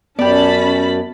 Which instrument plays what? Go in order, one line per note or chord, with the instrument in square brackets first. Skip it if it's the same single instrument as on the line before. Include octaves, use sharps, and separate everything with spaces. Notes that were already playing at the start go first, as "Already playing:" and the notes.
[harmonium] F#2 [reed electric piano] B3 [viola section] C#4 A5 B5 [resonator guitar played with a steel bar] G4 D5